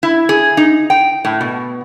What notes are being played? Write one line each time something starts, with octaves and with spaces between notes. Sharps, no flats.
E4
G#4
D#4
G5
A2
B2